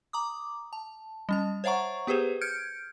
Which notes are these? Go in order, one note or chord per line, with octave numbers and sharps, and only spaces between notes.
A#5 D6 D#6
A5
G3 C#4 A5
C5 C#5 E5 F#5 A#5 C#6
B3 G4 G#4 B4 C5
F6 G6 G#6 C#7 D7